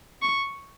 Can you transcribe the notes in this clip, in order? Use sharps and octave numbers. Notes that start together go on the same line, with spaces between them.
C#6